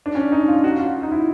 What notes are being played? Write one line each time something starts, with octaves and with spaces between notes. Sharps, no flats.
D4
C#4
D#4
F4
F#4
F4
D#4
E4